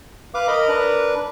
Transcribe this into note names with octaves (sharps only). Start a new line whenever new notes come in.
B4 F5 D6
A#4 D#5 B5
D4 B4